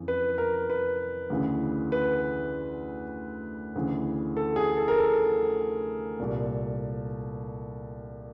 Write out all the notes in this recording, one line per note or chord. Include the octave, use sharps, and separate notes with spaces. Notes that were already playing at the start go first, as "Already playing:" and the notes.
Already playing: F2 C#3 E3
B4
A#4
B4
D2 C#3 E3
B4
D2 C#3 E3
A4
G#4
A4
A#4
A4
C2 A#2